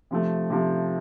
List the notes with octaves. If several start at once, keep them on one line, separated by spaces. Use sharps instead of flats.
C3 F3 A3
C3 F3 A3